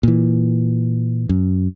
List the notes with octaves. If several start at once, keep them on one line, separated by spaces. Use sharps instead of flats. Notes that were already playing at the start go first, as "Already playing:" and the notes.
A#2 E3
F#2